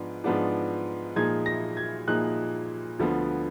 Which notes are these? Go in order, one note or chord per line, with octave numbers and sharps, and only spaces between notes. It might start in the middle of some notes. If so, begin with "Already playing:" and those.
Already playing: G#2 F3 B3 D4
G#2 F3 B3 D4
A#2 F3 G#3 D#4 G#6
A#6
G#6
A#2 F3 G#3 D#4 F#6
D2 D3 F3 B3